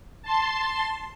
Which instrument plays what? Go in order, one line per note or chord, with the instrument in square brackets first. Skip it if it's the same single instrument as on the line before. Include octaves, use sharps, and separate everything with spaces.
[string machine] A5 C6